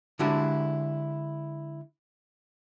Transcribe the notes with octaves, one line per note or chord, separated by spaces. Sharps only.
D3 G#3 D4 E4 F#4 G4